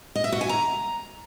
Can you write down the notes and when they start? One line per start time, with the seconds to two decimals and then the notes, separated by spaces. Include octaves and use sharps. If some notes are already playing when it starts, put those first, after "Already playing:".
0.15 D#5
0.24 E5
0.32 F#4
0.41 G#5
0.49 A#5